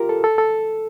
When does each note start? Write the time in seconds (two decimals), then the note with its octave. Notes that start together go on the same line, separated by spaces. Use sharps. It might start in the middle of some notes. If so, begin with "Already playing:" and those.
Already playing: F4 G4 A#4
0.09 A4
0.24 A4
0.38 A4